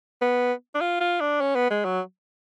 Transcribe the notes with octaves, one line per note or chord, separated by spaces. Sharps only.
B3
D4
F4
F4
D4
C#4
B3
G#3
F#3